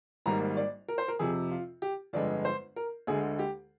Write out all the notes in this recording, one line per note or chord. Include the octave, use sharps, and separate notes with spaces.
G#1 G#2 G3 A#3 A#5
D5
A#4
C5
A#4
F2 C3 F3 G#4
F4
G4
G1 F2 D3 G#3 D5
C5
A#4
D2 D3 G#3 G#4
G4